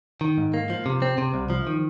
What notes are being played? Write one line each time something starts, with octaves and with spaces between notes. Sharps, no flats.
D#3
G#2
A#3
F3
C3
C4
C3
C2
F3
D#3